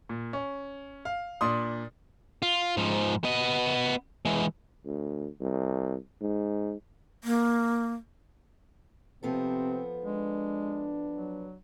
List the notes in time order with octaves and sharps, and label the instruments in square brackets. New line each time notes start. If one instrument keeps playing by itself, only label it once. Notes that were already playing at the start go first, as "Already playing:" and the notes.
[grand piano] A#2
C#4
F5
A#2 D4 C6 D#6
[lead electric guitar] F4
G#2 F3
B3 D#5
E3 G#3
[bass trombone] D2
C2
G#2
[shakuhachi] A#3
[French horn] C3 [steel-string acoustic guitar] F3 B3 A4 [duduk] C4
[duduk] G#3 [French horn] D4
[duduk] F#3